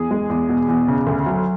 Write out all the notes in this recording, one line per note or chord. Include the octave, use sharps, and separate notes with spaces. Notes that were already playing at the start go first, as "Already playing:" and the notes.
Already playing: E2 G#4
G#3
E2
B2
E2
C#3
D2
F#3